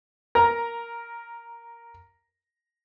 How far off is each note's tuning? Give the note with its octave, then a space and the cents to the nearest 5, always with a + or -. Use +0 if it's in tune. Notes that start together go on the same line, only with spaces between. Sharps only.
A#4 +0 A#5 +10